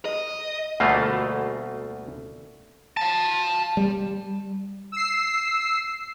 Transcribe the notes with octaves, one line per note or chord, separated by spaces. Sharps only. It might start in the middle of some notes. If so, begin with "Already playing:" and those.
D#5
D2 B2 G3 A3 A#3 F4
F5 A5
G3
E6 C7